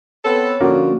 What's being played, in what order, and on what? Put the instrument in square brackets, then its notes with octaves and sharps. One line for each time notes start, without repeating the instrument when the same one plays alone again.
[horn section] B3 C4 A4 [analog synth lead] C#5
[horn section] D3 F3 [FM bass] A#3 [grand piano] C#4 F#4